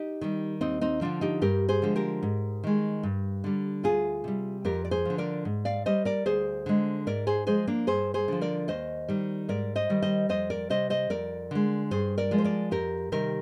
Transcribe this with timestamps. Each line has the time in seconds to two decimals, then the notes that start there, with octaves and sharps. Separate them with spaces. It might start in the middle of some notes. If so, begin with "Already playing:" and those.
Already playing: D#4 G4
0.21 D#3 G3
0.61 D#2 C4 D#4
0.81 C4 D#4
1.01 D3 F3 D4 F4
1.21 D#4 G4
1.42 G2 G4 A#4
1.69 G#4 C5
1.82 D3 F3 G#3
1.96 G4 A#4
2.22 G#2
2.64 D#3 G#3
3.03 G2
3.44 D3 G3
3.83 D2 F4 G#4
4.24 C3 G3
4.65 F2 G4 A#4
4.85 D5
4.91 G#4 C5
5.05 D3 F3
5.18 A#4 D5
5.45 G#2
5.65 D5 F5
5.86 G3 C5 D#5
6.05 A#4 D5
6.26 D2 G#4 C5
6.66 D3 G#3
7.07 G#2 A#4 D5
7.27 G#4 C5
7.47 F3 G#3 G#4 C5
7.67 A#3 D4
7.87 G2 G#4 C5
8.14 G#4 C5
8.28 D3 F3
8.41 A#4 D5
8.68 D#2 C5 D#5
9.08 D#3 G3
9.49 G#2 A#4 D5
9.75 C5 D#5
9.90 D#3 G3
10.02 C5 D#5
10.29 F2 C5 D#5
10.50 A#4 D5
10.70 C3 G3 C5 D#5
10.90 C5 D#5
11.10 F2 A#4 D5
11.51 D3 G#3
11.91 G2 G#4 C5
12.18 A#4 D5
12.31 F3 G#3
12.38 C5
12.44 A#4 D5
12.71 F2 G4 A#4
13.12 C3 D#3 G3 G4 A#4